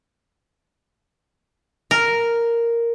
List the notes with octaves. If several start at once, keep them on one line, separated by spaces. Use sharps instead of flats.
A#4